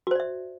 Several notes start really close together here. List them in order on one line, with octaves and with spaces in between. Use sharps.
F#4 C5 D5 E5